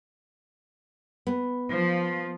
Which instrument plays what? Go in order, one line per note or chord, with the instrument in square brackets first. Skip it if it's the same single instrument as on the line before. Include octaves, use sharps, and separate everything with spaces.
[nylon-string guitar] B3
[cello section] F3